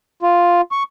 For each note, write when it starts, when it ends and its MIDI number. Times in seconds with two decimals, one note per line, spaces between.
0.23 0.61 65
0.72 0.83 85